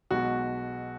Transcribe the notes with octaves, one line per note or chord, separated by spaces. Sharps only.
B1 B2 G#3 B3 F#4